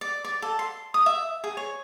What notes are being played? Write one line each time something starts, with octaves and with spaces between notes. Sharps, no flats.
D5
D5
A4
C6
D#6
E5
G#4
C#5